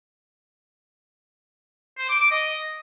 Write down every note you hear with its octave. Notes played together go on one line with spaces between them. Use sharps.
C5
D6
D6
D#5